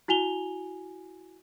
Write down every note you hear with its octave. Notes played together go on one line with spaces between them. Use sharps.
E4 F#4 G#5 F7 G7